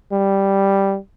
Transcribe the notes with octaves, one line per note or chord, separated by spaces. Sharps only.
G3